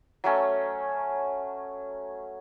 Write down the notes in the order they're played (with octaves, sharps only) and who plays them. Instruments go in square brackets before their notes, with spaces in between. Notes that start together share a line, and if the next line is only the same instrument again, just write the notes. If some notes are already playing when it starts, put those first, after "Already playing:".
[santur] F#3 A3 C#4